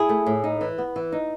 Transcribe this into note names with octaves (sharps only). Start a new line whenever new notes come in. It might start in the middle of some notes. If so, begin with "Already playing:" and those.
Already playing: E4 G#4
A3
A2
D#4
E3
B3
E3
D#4